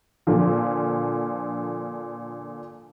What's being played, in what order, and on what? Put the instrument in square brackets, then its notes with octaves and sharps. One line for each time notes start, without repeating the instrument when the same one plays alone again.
[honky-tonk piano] A#2 D3 F3